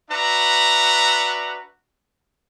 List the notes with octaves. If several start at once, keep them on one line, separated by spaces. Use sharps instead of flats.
D4 F#4 B4 E5 A#5